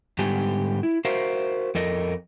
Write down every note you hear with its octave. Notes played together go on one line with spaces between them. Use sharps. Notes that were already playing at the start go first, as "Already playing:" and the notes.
G#2 D3 G3 B3 G4 G#5
E4
F#4 A#4 C5 E5 F5
F2 A4 A#4 D#5